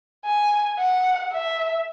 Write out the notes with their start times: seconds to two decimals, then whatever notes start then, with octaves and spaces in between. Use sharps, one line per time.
0.25 G#5
0.79 F#5
1.33 E5